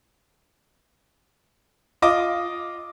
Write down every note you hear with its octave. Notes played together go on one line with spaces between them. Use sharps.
F4 D#5 D6